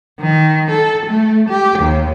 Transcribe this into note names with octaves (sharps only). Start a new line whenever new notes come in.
D#3
A4
A3
G4
D#2